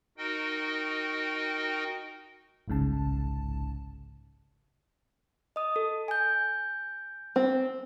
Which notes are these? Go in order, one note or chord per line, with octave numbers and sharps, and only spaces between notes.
D#4 F#4 A#4 D#5 G5
G1 C2 G#2 C#3 A5
D#5 D#6
A4
G#5 G6
C4